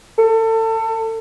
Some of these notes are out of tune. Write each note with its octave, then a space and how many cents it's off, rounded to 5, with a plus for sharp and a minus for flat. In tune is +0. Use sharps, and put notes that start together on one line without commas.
A4 +30